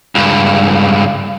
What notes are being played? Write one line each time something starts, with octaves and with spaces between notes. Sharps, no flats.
C#2 G2